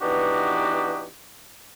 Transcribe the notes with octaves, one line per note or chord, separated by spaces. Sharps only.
E3 B3 D4 D#4 F#4 G4